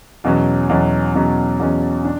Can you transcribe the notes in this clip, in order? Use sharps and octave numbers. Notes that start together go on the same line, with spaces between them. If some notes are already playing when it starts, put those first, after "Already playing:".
E2 B2 F#3 C#4
E2 B2 F#3 C#4
E2 B2 F#3 C#4
E2 B2 F#3 C#4
D4